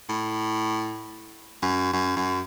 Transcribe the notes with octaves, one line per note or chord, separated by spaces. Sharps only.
A2
F#2
F#2
F#2